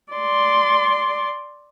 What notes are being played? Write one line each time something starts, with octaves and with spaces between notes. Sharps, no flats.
D5 C6